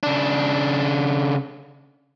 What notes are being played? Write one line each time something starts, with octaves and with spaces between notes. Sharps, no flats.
C#3 D4